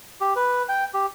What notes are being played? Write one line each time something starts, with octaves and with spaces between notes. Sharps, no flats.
G4
B4
G5
G4